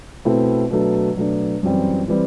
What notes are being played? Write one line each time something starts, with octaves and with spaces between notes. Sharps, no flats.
B2 A3 C4 E4
B2 F#3 A3 D4
B2 F#3 A3 D4
F#2 E3 G3 C4
E3 G3 C4